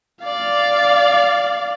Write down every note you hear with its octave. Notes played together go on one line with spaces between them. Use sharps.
D5 F5